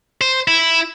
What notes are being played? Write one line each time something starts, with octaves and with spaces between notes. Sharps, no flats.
C5
E4